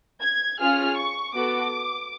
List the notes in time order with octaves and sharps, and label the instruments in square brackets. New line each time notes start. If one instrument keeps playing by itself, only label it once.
[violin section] G#6
C#4 F4 G#4 F6
C#6
B3 F#4 A4 D6